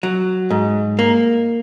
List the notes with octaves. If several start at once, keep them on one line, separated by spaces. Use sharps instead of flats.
F#3
G#2
A#3